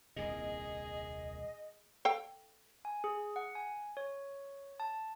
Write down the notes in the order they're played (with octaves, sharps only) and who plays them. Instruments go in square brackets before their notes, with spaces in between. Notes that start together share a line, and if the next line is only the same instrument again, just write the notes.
[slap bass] D#1 C2 A#2 [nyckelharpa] G#4 [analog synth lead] D#5
[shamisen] A4 F5 G5
[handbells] G#5
G#4
F#5
G#5
C#5
A5